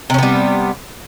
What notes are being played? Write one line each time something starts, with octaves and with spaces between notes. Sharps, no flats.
C3 G3 B3 C#4